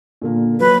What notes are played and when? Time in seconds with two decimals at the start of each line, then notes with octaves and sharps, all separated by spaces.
0.22 A#2 D3 A#3
0.60 F#3 B4